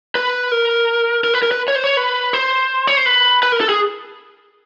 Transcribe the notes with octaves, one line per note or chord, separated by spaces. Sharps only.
B4
A#4
A#4
B4
A#4
B4
C#5
C5
C#5
B4
C5
C#5
C5
B4
B4
A#4
A4
G#4